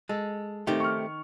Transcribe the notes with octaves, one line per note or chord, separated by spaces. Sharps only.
G#3 A4
D#3 A3 C4 G4
C#6 F6